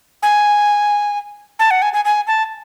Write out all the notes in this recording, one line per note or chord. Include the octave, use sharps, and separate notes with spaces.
G#5
A5
F#5
G#5
G#5
G#5
A5